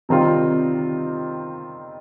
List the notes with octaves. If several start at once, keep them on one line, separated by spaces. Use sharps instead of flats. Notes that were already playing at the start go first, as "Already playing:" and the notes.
C3 D#3 G3 C4 F4